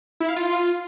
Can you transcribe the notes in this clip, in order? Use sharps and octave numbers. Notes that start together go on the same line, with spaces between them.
E4
F5
F4